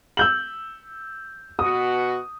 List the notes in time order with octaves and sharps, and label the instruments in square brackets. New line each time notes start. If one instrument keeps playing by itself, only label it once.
[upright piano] E6 G6 F#7
[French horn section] B2 F#4 [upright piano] D#6